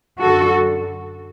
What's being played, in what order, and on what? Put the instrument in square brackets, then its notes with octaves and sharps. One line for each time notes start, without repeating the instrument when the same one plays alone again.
[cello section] F#2 D3 F#4 A4